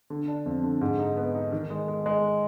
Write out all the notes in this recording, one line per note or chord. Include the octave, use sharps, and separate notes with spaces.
D3
D4
F2
D3
G#2
D#4
B3
D#4
D#3
G#3
G#3
G#3